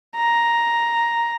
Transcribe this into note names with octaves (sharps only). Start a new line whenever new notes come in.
A#5